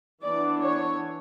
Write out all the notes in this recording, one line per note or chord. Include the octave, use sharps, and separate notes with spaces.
E3 B3 D4 D5
C#5